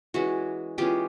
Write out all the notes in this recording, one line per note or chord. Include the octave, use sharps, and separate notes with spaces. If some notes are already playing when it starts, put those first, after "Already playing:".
E3 G#3 C#4 F#4
E3 G#3 C#4 F4 G4